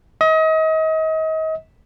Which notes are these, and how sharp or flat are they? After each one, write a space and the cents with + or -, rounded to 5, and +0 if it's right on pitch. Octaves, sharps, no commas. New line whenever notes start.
D#5 +35